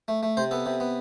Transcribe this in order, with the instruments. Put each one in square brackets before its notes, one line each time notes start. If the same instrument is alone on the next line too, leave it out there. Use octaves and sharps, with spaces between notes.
[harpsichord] A3
A3
C3 C5
B3 A4
C3
B3